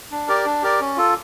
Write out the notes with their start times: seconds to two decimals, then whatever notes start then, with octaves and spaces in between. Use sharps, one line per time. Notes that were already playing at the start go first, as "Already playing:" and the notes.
0.11 D4
0.28 G4 A#4 D5
0.46 D4
0.62 G4 A#4 D5
0.81 C#4
0.97 F4 A4